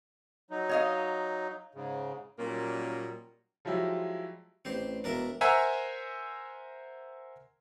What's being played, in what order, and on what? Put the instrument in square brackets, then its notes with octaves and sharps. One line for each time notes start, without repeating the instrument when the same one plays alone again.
[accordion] F#3 D#4
[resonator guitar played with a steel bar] C#5 D#5 F5
[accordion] G#2 C#3
[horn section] A#2 F#3 G3 A#3 C#4 D#4
[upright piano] F3 F#3 G#3 E4 G4
[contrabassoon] A1 [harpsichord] C4 G4 C5
[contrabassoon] E1 [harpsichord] D4 A#4 E5
[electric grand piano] A#4 C5 E5 F#5 G#5 A#5